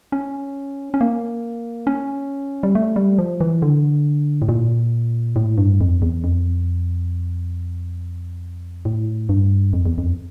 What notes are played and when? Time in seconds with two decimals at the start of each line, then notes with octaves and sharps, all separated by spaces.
0.12 C#4
0.94 C#4
1.01 A#3
1.87 C#4
2.63 G3
2.75 A3
2.96 G3
3.19 F3
3.41 E3
3.62 D3
4.42 A2
4.49 A#2
5.36 A2
5.58 G2
5.81 F2
6.02 E2
6.24 F2
8.85 A2
9.29 G2
9.73 F2
9.86 E2
9.98 F2